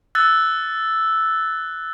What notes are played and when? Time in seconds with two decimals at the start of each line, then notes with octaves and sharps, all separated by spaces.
0.15 E6 F#6 A6